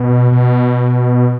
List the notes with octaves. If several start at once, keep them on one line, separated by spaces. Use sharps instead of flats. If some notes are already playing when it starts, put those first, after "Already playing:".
Already playing: B2
B2